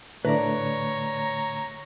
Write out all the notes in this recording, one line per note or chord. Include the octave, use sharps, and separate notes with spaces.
A2 D3 A3 B4 C#5 D5 A#5